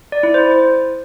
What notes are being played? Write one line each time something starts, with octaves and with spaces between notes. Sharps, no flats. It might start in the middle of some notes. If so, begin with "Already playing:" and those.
D5
E4
C5